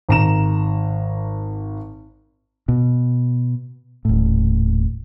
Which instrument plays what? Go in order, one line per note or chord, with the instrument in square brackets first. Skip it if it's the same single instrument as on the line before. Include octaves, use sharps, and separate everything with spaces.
[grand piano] G#1 A#5 E7
[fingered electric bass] B2
D#1 A2